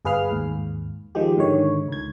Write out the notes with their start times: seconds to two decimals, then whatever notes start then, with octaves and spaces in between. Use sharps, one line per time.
0.05 G1 G#4 B4 F5 F6
0.31 D#2 G#2
1.15 D#3 F3 G#3 G4
1.37 G#2 D3 D#3 C#5
1.88 C#2 G#6